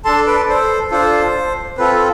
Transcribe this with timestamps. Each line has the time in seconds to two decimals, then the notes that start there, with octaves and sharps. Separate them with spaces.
0.05 D4 A4 A5 C6
0.26 B4 D5
0.49 A4 C5
0.91 D4 F4 A4 C5
1.78 C4 F4 A4 B4